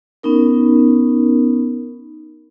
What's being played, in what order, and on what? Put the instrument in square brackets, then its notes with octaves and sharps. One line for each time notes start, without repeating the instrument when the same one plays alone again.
[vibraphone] B3 C#4 D#4 A#4